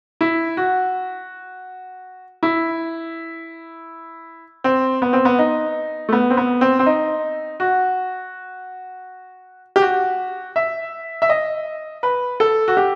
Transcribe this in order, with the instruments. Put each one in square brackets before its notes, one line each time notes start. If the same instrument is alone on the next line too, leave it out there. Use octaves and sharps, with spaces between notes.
[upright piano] E4
F#4
E4
C4
B3
C4
B3
D#4
A3
B3
C4
B3
C4
C4
D#4
F#4
G4
F#4
E5
E5
D#5
B4
A4
F#4
G4